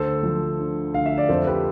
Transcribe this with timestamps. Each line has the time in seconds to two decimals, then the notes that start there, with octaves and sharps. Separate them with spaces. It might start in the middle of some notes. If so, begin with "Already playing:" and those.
Already playing: D2 A4 C5
0.23 F3
0.59 D3
0.94 D2 F5
1.06 E5
1.18 D5
1.29 F2 A4 C5
1.47 G4 B4